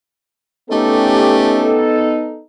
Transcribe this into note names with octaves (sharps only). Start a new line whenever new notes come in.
A3 B3 C#4 D#4 G4 A4